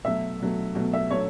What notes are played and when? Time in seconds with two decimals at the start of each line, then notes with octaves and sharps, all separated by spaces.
0.05 B2 F#3 A3 E5
0.40 B2 F#3 A3
0.75 B2 F#3 A3
0.93 E5
1.10 F#3 A3 C#5